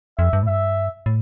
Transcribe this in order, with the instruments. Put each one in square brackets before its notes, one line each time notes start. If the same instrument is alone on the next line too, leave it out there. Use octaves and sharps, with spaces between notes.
[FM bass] F2 [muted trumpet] E5
[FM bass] G2
A2
[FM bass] G2 [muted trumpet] E5
[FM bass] A2